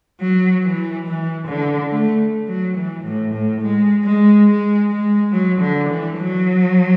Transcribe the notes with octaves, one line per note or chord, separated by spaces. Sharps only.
F#3
E3
E3
D3
A3
F#3
E3
A2
A2
G#3
G#3
G#3
G#3
F#3
D3
E3
F#3